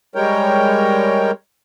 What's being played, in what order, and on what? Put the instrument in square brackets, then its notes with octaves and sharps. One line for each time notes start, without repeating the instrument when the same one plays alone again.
[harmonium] G3 G#3 A#4 C#5 G5